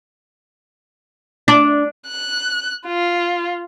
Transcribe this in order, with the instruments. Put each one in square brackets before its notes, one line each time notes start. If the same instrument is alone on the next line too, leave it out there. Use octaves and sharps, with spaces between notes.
[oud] D4
[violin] F#6
F4